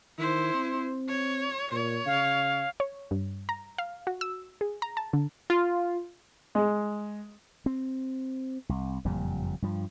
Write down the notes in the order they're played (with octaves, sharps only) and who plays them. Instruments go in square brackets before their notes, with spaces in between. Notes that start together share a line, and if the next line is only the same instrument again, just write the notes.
[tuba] D#3 [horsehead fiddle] E4 C5
[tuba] C4
[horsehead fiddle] C#5
[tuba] A#2 [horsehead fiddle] C#5
[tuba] C#3 [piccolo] F5
[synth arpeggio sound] C#5
G2
A#5
F5
F#4
E6
G#4
A#5
A5
D3
[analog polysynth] F4
[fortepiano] G#3
[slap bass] C4
C2
F#1 F2 A#2 G3
G2 F3